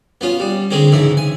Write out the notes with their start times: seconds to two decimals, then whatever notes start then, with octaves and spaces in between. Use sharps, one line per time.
0.21 B3 C#4 F4
0.40 G3
0.70 D3 G#3 C4 C#4
0.92 G#2 C#3 E3 E5
1.17 G#5